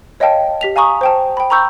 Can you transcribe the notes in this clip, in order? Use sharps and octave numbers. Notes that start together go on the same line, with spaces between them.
C#5 D#5 F5 G5 A5
G4 B6 F7
F5 G#5 A#5 C#6 D#6
C5 G5 A5
G5 B5
A#5 B5 C#6 E6 G6